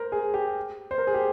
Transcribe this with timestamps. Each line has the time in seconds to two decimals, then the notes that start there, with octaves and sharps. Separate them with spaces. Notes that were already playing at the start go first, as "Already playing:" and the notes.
Already playing: A#4 C5
0.12 G#4
0.34 G4
0.91 C5
0.98 A#4
1.07 G#4
1.14 G4